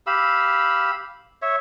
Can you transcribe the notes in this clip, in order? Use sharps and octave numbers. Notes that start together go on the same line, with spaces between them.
G4 F5 B5 E6
C#5 E5